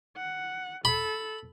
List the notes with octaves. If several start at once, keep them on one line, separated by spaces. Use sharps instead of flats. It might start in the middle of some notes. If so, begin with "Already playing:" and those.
F#5
A4 B5